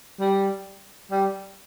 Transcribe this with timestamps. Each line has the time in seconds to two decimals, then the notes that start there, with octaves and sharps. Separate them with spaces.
0.20 G3
1.11 G3